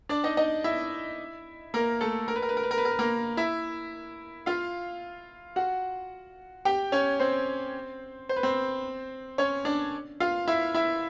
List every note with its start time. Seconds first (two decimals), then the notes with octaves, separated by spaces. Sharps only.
0.09 D4 D5
0.24 D#4 D#5
0.37 D#4 D#5
0.64 E4 E5
1.74 A#3 A#4
2.01 A3 A4
2.28 A#4
2.36 B4
2.42 A#4
2.49 B4
2.57 A#4
2.63 B4
2.71 A#4
2.78 B4
2.85 A#4
2.91 B4
2.99 A#3 A#4
3.37 E4 E5
4.46 F4 F5
5.56 F#4 F#5
6.65 G4 G5
6.92 C#4 C#5
7.20 C4 C5
8.29 C5
8.36 B4
8.43 C4 C5
9.38 C#4 C#5
9.65 D4 D5
10.20 F4 F5
10.47 E4 E5
10.74 E4 E5